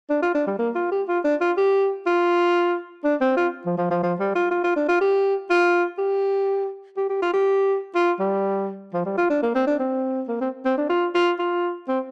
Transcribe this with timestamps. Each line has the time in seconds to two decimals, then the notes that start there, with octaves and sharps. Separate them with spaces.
0.10 D4
0.22 F4
0.34 D4
0.47 G3
0.59 A#3
0.75 F4
0.91 G4
1.08 F4
1.24 D4
1.41 F4
1.57 G4
2.06 F4
3.04 D4
3.21 C4
3.37 F4
3.66 F3
3.77 F3
3.90 F3
4.03 F3
4.19 G3
4.35 F4
4.51 F4
4.64 F4
4.76 D4
4.88 F4
5.01 G4
5.50 F4
5.98 G4
6.97 G4
7.09 G4
7.22 F4
7.33 G4
7.95 F4
8.19 G3
8.94 F3
9.05 G3
9.18 F4
9.30 D4
9.43 A#3
9.55 C4
9.67 D4
9.79 C4
10.28 A#3
10.41 C4
10.65 C4
10.77 D4
10.90 F4
11.15 F4
11.39 F4
11.88 C4